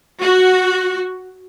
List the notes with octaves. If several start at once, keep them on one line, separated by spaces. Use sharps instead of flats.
F#4